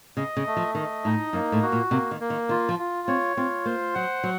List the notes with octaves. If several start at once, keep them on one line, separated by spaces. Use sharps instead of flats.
C#3 D#5
C#3
A3
F3
D#3 D#5
A2 D#4
F#2 A#3
A2
F#4
A#2
C3 A#3
D#3
A#3
D#3
D#3 F4
F3
F4
C4 C#5
C4 F4
A#3 C5
F#3 F#5
F#3